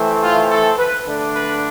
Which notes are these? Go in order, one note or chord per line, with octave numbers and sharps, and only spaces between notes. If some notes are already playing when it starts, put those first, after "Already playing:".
Already playing: E3 A3 C4
F4
A4
B4
D3 A3 D4
B4